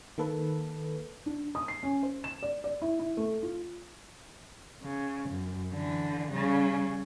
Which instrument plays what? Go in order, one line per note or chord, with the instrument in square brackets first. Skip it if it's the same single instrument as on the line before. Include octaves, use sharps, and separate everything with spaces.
[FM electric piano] D#3 A#3 A4 B4
[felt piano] D4
D#6
C7
C#4
C5
E7
D5
D5
E4
E4
A3
F4
[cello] C#3
F#2
D3 E3
C#3 G3